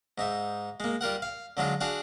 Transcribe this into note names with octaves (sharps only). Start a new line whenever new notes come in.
G#2 D#4 E5
G#3 A#3
G3 F4 A#4 F#5
F5
D3 F#3 G#3 F4
D4 F#4 G#4 F5